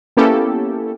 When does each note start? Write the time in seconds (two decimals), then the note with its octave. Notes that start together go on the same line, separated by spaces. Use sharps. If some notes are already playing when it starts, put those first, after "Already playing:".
0.17 A#3 B3 C#4 E4 G4 A4